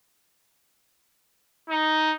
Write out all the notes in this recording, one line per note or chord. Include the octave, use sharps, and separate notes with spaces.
D#4